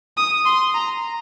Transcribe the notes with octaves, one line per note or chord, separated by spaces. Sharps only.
D#6
C6
A#5